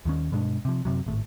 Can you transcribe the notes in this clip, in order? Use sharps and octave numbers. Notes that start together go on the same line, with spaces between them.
D#2 D#3 C#4
G2 B2 G#3 D4
C3 F3
F#2 C3 F#3
G#1 A2